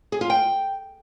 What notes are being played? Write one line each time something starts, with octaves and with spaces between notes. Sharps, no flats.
G#4
F4
G5